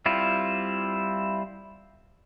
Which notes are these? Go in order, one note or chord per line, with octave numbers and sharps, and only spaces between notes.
G3 C4 E4 F4